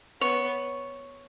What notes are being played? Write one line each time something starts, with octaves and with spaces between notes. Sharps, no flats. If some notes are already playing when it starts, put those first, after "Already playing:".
B3 C#5